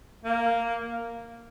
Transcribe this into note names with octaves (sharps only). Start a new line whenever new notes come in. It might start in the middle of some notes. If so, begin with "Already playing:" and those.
A#3